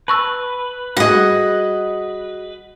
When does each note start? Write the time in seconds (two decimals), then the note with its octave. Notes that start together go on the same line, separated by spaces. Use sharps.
0.08 B4 A5 C#6 E6
0.97 G3 F#4 G#4 D#5 F#5